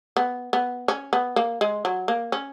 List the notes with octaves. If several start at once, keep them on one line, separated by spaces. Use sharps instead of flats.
B3
B3
C#4
B3
A#3
G#3
F#3
A#3
C#4